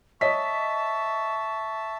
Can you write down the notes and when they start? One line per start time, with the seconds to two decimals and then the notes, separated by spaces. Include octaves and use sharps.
0.21 C#5 D#5 E5 A5 C#6 B6